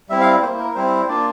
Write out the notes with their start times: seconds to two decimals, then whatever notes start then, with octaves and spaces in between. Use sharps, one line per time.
0.09 G3 C4 E4 E5
0.21 F5
0.42 A#3 E4 C5
0.59 A#4
0.75 G3 C4 E4 C5
1.08 A#3 D4 F4 D5